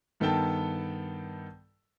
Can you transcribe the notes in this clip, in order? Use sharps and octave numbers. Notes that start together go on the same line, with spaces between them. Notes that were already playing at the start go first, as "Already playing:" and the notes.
G2 D#3 B3 A4 G5 A5